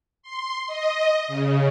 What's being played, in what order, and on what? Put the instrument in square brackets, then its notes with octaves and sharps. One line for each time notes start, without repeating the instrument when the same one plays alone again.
[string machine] C6
D#5
C#3